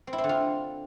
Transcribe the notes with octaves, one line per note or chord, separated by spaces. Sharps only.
C4
E4
C4
D3
F4